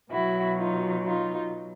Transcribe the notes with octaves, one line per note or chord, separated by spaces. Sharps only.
B2 F#3 E4 F#4
D#4 F4
D#4 F4